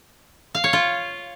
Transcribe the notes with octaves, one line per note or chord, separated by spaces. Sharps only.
F5
C#5
F4